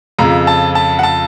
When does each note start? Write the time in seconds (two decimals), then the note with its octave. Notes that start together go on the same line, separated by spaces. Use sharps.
0.19 F2 C#3 F3 A#5
0.47 A5
0.75 A5
0.99 F#5
1.03 A5